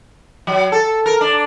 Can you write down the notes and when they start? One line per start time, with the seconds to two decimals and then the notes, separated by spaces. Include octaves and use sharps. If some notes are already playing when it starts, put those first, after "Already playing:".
0.47 F#3
0.72 A4
1.06 A#4
1.21 D4